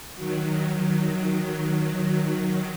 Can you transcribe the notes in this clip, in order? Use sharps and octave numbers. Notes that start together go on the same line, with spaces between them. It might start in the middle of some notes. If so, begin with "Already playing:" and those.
D#3 F#3